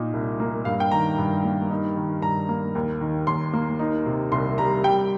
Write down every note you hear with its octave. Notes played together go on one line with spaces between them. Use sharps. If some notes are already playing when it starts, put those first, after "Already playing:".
Already playing: A#2 D#4
C2
A#3
G2 F5
G5
D#3 A#5
G2
A#3
D#4
D#3
G2 A#5
A#3
D#2
D#3
D#2 C6
A#3
D#4
C3
C2 C6
G3 A#5
G3 G5